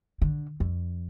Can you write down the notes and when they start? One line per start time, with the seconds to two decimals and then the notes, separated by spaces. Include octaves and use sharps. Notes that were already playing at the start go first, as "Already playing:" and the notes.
0.22 D3
0.60 F2